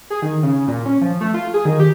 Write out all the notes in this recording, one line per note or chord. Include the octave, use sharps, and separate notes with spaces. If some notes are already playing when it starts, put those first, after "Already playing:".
G#4
D#3
C#3
A#2
C#4
F3
A3
F4
G#4
D#3
G4